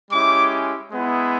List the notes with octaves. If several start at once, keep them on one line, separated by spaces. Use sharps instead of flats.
G#3 C#4 E4 G4 D6
G#3 B3 E4